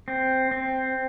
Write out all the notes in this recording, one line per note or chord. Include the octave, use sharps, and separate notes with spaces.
C4
C4